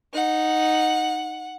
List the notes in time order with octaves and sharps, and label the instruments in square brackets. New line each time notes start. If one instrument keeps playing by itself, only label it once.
[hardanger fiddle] D#4 [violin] F#5